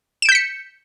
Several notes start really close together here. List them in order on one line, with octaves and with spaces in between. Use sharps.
E7 D7 G6 B6 C#7